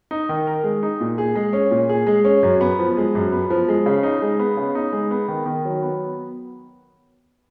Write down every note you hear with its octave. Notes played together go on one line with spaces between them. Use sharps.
D#4
D#3
A#4
G#3
D#4
A#2
G#4
G#3
C#4
A#2
G#4
G#3
C#4
F#2
B3
F3
G#3
F#2
B3
F3
G#3
C#3
D#4
G#3
B3
C#3
D#4
G#3
B3
D#3
D#3
F#3
B3